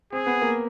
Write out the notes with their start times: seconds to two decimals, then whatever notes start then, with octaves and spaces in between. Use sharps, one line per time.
0.12 C4 G#4
0.26 B3
0.41 A#3